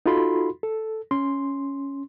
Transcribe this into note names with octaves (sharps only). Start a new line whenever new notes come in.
D#4 F4 F#4 A4 B5 C6
A4
C#4 C6